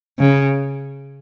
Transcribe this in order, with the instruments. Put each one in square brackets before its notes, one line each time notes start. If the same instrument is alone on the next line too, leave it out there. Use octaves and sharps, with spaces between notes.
[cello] C#3